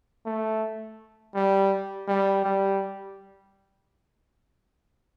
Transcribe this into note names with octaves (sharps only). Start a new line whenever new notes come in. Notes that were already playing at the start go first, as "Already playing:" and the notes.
A3
G3
G3
G3